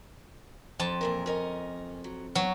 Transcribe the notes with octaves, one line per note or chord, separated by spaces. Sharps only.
F2 A5
A#2 E3 A#4
C#4 A#4 D#5
F#3
F#2 F#3 B3